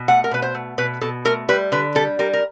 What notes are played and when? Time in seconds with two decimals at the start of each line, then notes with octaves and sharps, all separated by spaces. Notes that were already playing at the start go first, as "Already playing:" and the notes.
Already playing: B2
0.08 A3 F#5
0.24 A#4
0.31 B2 B4
0.42 C5
0.55 A3
0.78 B2 B4
1.01 B2 A4
1.25 A3 A#4
1.49 G3 B4
1.72 D3 B4
1.95 G3 A4
2.19 G3 A#4
2.33 A#4